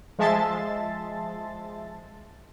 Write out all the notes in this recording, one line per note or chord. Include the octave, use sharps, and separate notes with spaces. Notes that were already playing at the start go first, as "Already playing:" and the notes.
F3 G#3 E5 A5 C6 A6